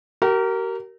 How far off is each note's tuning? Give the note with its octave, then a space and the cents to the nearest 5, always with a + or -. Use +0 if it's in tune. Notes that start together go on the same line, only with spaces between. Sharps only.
G4 -45 A#4 -10